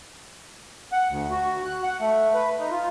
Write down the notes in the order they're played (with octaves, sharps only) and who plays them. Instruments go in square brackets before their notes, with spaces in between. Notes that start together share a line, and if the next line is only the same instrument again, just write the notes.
[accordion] F#5
D2
F#4
F#6
F#5
A3
B4
D#4
F4